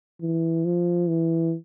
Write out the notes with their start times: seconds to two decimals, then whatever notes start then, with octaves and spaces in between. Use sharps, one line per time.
0.21 E3
0.65 F3
1.08 E3